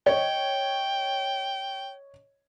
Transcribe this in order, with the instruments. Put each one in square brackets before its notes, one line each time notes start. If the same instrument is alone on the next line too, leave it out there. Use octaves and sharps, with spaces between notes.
[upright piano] C#5 D#5 [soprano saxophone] G5